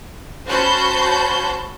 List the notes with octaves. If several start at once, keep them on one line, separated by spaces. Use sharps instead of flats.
C#4 F#4 C5 A5 B5 G6